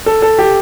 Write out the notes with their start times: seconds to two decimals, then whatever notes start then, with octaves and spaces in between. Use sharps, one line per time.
0.06 A4
0.22 A4
0.39 G4